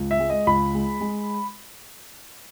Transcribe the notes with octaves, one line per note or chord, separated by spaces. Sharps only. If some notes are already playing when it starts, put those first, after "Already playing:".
Already playing: C#2
E5
G#3
D#5
C#2 B5
G#3
G#3